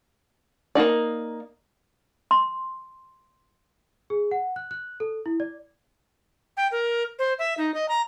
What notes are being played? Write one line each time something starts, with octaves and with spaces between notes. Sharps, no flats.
A#3 C#4 D#4 D5
C6
G#4
F#5
F#6
F#6
A4
E4
D5
G5
A#4
C5
E5
D#4
D#5
A#5